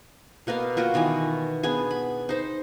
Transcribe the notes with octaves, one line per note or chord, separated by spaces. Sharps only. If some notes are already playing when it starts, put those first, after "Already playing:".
B2 A#3 B3 F5
A#3 F4 F#4 G5
B2 D#3 E3 G#5
B3 D4 G#4 G#5
B5
D#4 C5